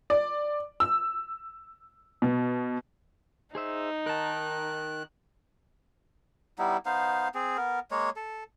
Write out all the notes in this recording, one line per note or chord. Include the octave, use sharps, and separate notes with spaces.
D5
E6
B2
D#4 G#4 C5 E5
D#3 A#4 A5 F#6
G3 B3 D#4 E4
B3 D#4 C5 F5
C4 G#4
B3 A#4
G#3 A#3 C#5
A4